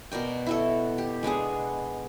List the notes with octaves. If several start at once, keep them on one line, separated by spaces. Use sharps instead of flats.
B2 A#4 D5 G5
E4 F#4 A4
G4
G#3 B3 D4 G#4